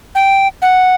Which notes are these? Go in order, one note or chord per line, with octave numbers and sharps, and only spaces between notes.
G5
F#5